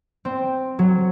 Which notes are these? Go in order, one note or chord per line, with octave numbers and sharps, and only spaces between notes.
C4
F#3